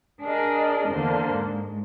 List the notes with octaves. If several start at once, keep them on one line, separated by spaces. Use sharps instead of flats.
D4 G#4 A#4 D5 D#5
E2 D3 A#3 C5
G#2